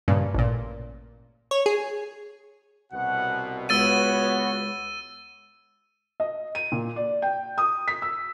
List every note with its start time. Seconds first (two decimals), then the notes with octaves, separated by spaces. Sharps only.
0.08 G2 A#2 C#3
0.34 A1 A#2
1.51 C#5
1.66 G#4
2.92 C2 B2 F#5
3.69 C#2 B3 F#4 C#5 B5 E6 A6 D#7
6.20 D#5
6.55 D#7
6.72 A#2
6.96 D5
7.22 G5
7.58 D#6
7.88 B6
8.02 E6